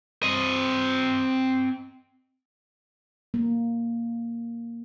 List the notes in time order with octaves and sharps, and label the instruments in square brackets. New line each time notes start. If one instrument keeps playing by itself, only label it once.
[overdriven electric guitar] C4 D#5
[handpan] A#3